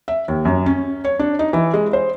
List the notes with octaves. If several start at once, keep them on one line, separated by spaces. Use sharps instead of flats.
E5
D#2
F#2
C#4
C#5
D4
D#4
E3
G#3
C5